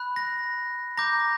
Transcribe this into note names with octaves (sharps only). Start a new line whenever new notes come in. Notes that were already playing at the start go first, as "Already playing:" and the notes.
Already playing: B5 F#6
A#6
A#5 D6 G6 A#6